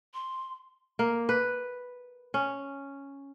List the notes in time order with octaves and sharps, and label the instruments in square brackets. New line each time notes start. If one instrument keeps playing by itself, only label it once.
[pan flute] C6
[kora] A#3
B4
C#4